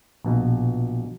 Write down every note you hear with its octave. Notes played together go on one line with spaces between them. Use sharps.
A#1 B2